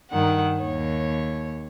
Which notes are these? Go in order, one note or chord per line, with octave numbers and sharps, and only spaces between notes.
G2 D#3 F#5
D#2 C#5